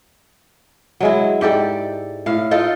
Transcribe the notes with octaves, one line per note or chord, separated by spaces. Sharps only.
F#3 G#3 E4
G#2 G4 A4 D5
A2 F5
D#4 F4 A4 A#4